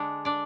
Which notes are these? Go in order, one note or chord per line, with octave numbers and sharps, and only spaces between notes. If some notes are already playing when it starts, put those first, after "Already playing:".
Already playing: D3 G#3 D4
D4 D5